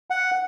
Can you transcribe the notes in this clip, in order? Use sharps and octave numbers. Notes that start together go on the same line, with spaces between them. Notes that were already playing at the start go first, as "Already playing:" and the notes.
F#5